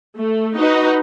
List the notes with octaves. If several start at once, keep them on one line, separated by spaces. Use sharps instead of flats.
A3
D#4 F#4 B4